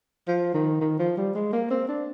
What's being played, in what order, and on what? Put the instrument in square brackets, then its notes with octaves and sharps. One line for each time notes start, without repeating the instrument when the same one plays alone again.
[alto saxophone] F3
D#3
D#3
F3
G3
G#3
A#3
C4
D4